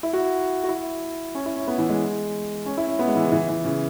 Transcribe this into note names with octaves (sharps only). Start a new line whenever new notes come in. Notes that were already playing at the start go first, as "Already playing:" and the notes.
E4
F#4
F#4
E4
C#4
E4
C#4
B3
E3
G#3
C#4
E4
C#4
B3
G#3
E3
C#3
E3
E3
C#3